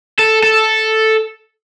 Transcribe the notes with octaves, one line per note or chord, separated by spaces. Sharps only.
A4
A4